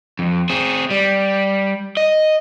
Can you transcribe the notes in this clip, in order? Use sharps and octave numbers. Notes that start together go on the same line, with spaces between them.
F2
C4 G#4
G3
D#5